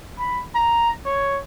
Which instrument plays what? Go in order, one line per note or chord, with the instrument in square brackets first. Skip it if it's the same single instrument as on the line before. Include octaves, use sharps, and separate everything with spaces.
[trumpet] B5
A#5
C#5